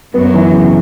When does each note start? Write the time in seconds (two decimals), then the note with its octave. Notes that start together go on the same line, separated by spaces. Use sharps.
0.14 F#2 F#3 B3
0.34 E3
0.52 C#3